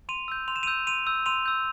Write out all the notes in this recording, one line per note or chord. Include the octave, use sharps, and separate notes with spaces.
C6 D#7 F7
E6 G6
C6 F7
E7
E6 G6 D#7 F7
C6 D#7 F7
E6 G6
C6 D#7 F7
E6 G6